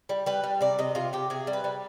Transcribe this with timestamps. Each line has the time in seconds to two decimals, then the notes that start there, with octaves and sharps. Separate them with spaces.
0.09 G3
0.26 G3 B4
0.44 G3
0.61 C3 D5
0.79 C3 D#5
0.95 C3 F4
1.13 C3 G4
1.30 C3 G#4
1.47 G3
1.53 B4
1.64 G3